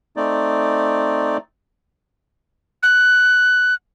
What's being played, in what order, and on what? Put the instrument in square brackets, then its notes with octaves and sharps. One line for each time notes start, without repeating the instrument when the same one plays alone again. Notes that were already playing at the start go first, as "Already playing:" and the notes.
[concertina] A3 C4 D#4 D5
[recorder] F#6